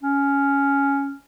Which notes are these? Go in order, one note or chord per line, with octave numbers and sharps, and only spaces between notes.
C#4